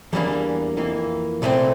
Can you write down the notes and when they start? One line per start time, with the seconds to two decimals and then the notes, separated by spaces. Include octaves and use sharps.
0.13 E2 E3 G3 A#3 D4
0.77 F2 E3 A#3
1.42 C2 A#2 A3 C4